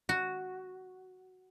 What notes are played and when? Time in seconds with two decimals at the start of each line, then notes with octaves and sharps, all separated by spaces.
0.09 F#4